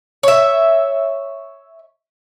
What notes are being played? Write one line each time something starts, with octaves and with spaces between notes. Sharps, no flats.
C#5 E5